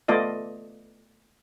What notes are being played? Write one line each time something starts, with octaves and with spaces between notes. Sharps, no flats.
A3 B3 F4 D5 D#5